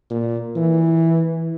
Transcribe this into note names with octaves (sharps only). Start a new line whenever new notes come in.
A#2
E3